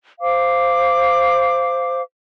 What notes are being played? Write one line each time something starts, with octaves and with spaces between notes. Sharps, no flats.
C5 F5 D6